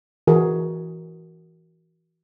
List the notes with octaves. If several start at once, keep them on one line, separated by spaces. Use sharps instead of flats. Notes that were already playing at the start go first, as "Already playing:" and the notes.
E3 F#4 G#4 A#4